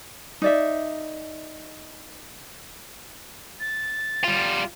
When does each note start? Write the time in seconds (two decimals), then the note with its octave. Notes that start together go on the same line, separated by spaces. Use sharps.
0.42 D#4 D5 E5
3.60 A6
4.24 G3 F4